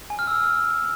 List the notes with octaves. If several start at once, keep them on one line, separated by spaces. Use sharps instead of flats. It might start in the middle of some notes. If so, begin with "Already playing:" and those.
G#5
F6
E6
F6